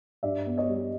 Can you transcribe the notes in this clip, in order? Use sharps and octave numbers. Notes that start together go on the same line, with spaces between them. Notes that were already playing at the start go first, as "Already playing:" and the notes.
G2 D5 E5
B3
C#5 D#5
G3